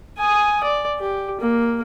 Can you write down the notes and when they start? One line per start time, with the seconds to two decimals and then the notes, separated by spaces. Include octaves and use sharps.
0.18 G#5 D#6
0.64 D5
0.99 G4
1.40 A#3